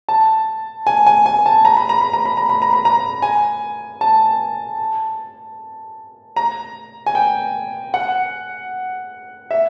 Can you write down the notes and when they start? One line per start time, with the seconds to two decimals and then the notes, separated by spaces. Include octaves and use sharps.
0.09 A5
0.87 G#5
1.06 G#5
1.26 G#5
1.46 A5
1.65 A#5
1.77 B5
1.89 A#5
2.01 B5
2.13 A#5
2.25 B5
2.37 A#5
2.49 B5
2.62 A#5
2.73 B5
2.85 A#5
3.22 G#5
4.01 A5
6.36 A#5
7.06 G#5
7.15 G5
7.94 F#5
9.51 E5